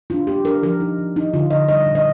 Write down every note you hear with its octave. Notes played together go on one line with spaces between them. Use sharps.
D4 F4
A#3 G4
D4 A#4
F3 A#4
D#4
F3
D#4
D3 F4
D3 D#5
G3 D#5
A#2
D#5